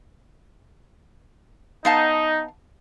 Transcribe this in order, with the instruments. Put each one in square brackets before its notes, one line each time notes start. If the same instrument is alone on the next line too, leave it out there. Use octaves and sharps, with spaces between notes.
[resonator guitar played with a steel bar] B3 F5 A5 [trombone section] D#4